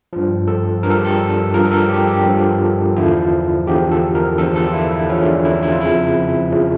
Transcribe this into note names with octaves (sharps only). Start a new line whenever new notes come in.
G2 F3
A4
G2 F3 A#4
A4
G4
A4
G2 F3 A#4
A#4
A4
G4
G4
G2 F3
E2 D3 F3 E4
E2 D3 F3 G4
A4
A#4
E2 D3 F3 A4
A4
F4
E4
E4
E2 D3 F3 C#4
D4
E4
E4
F4
F2 C#3 F3 E4
C#3 F3